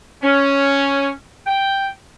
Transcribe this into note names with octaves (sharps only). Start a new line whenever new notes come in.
C#4
G5